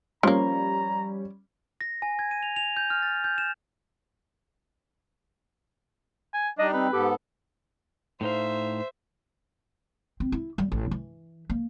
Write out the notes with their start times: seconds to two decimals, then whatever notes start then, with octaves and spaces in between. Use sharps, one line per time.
0.23 F3 G3 A#3 C#4 A#5
1.81 A#6
2.02 G#5
2.19 G#6
2.31 D#7
2.43 F7
2.56 F7
2.77 G6
2.90 F6
3.02 A6
3.24 G6
3.38 E7
6.34 G#5
6.59 G3 D4 D#4 D#5
6.73 C4 B4
6.93 G#2 B3 G4 A4
8.21 A2 D#4 C5 E5 F5
10.20 C4
10.32 E4
10.58 G3
10.72 A1
10.91 E3
11.50 A#3